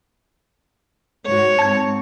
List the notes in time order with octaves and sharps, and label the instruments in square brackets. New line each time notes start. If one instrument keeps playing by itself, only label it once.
[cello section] G#2 F#4 [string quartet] C#5
[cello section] G#2 C4 [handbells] A5 G#6